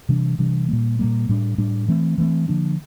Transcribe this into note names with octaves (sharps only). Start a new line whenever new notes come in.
C3 E3 G3 D4
C3 E3 G3 D4
A#2 G3 A#3
A#2 G3 A#3
A2 G3 D4
A2 G3 D4
E3 A3 C4
E3 A3 C4
D3 F3 A#3 D4